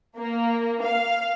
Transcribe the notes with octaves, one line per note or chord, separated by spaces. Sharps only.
A#3
F5